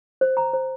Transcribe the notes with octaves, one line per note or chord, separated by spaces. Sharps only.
C5
A#5
C5